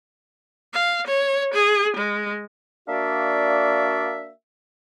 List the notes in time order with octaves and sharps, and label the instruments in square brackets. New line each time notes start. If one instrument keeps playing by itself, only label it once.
[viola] F5
C#5
G#4
G#3
[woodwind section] A#3 D4 F#4 D5 E5 F5